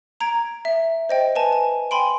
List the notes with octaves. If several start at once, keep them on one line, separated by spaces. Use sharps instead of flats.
A#5 G#6 D7
E5
C5 D#5 G5
B4 G#5 A5
G#5
G5 G#5 B5 C6 D7